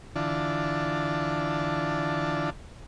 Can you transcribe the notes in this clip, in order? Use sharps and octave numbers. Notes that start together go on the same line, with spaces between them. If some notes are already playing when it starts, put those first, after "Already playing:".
D3 E3 D4 F4 A5